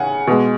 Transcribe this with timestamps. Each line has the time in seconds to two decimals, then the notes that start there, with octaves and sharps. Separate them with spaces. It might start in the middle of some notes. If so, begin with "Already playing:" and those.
Already playing: C#3 F#5 G#5
0.27 B2 G#3